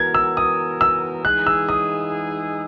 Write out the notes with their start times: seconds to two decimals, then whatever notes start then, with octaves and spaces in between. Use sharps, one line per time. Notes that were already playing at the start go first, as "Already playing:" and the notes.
Already playing: E3 B3 F#4 A#4 G#6
0.14 E6
0.37 D#6
0.81 E6
1.25 E3 G#3 D#4 G#4 F#6
1.47 E6
1.69 D#6